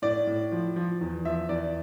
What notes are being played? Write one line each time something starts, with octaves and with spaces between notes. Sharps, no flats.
A2 D5
A2
F3
F3
E2
F3 E5
E2 D5